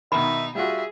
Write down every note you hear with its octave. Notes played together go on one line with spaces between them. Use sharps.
B2 D#3 D#4 E5 B5
G3 F4 F#4 G#4 E5